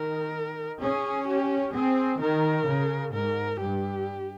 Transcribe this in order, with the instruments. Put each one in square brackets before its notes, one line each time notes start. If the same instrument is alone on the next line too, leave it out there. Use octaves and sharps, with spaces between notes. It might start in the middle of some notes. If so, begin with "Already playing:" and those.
Already playing: [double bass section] D#3 [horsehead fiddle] A#4
[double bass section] C#4 [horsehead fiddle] G#4
[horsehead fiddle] G4
[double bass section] C4 [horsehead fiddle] G#4
[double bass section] D#3 [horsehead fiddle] A#4
[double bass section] C#3
[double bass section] G#2 [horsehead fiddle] A#4
[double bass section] G2 [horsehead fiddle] G4